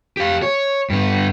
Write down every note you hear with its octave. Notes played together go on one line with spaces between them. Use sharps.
G4 F5
C#5
G2 B3